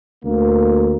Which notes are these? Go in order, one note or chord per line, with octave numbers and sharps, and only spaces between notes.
D2 A#3